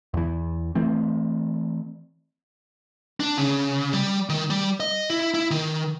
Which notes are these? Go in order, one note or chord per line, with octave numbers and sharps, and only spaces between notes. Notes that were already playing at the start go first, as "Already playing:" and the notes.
E2 E3
E3 A3 C4
D4
C#3
G3
D#3
G3
D#5
E4
E4
D#3